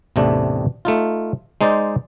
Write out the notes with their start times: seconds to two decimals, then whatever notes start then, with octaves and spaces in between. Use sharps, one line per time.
0.16 A1 E2 C3 A3 D4
0.85 A3 D#4 F4
1.61 G#3 D#4 C5 D5